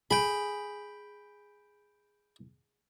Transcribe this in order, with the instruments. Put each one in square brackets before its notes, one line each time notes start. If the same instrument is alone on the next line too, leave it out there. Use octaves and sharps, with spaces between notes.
[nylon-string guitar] G#4 [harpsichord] G5 B5